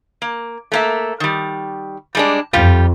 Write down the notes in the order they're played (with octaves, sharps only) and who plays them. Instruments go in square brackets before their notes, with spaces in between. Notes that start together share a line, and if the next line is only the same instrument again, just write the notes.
[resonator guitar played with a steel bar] A#3
A3 A#3 E5
D#3 G3
G3 G#3 D4
[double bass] F2 [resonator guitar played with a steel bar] G3 F4 G4